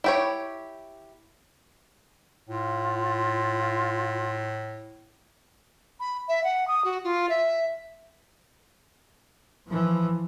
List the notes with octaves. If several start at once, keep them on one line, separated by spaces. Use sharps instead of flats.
E4 G4 C#5
A2 F4
B5
E5
F#5
D#6
F#4
F4
E5
E3 F3